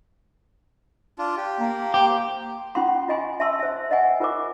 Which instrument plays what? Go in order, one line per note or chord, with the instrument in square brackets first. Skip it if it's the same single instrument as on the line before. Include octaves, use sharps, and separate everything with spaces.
[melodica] D4 F4
G4
[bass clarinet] A#3
[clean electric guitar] G4 [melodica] C5
[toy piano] C#4 F4 F#5 G5 C6
F4 D#5 G#5 C6
E5 A5 C6 E6
C5 E5
C5 D#5 F#5 G#5
F4 A#4 C5 D6